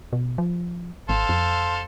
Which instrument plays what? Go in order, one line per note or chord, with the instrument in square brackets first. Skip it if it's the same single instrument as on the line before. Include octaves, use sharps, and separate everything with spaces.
[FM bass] B2
F3
[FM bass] G#1 [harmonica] A4 C5 F5
[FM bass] F2